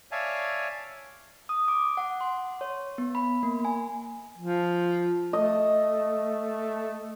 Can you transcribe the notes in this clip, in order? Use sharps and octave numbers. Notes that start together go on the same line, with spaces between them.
C#5 D5 E5 F5 G#5 A5
D#6
D6
F#5
C6
C#5
B3
B5
A#3
G#5
F3
A3 D#5